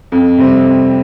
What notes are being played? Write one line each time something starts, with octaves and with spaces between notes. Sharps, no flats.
F2
C3 G3 C4
F2